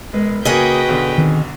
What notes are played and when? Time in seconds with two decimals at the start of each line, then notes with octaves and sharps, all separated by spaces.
0.13 E1 G#3 B4
0.45 C#3 A#3 F#4 G#4 B4 D#5 G5 A#6
0.89 B1 D3
1.18 D#3 C4